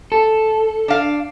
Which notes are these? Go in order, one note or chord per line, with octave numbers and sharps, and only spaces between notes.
A4
D4 F5